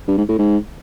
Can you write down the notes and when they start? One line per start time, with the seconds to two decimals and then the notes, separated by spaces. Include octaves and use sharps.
0.08 G2
0.18 G#2
0.29 A2
0.38 G#2